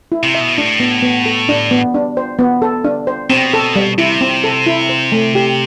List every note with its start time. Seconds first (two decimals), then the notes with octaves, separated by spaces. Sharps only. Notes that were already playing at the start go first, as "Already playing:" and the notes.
0.12 E4
0.23 C3
0.35 E5
0.40 B2
0.58 A2 D4
0.80 B3
1.03 B3
1.26 A4
1.49 D4
1.71 B3
1.94 D4
2.17 C5
2.39 B3
2.62 A4
2.84 D4
3.07 C5
3.30 B2 C4
3.54 A4
3.76 G3
3.98 C3 E4
4.21 C4
4.44 A4
4.66 E4
4.89 C5
5.12 A3
5.35 G4